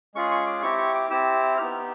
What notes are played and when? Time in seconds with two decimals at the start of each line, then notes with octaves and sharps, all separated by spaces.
0.14 G#3 C#4 F4 G#4 C#6
0.31 C#6
0.46 D6
0.63 C4 E4 G4 C#6
0.78 C#6
0.95 D6
1.10 C4 E4 G4 E6
1.58 B3 D#4 G4 F6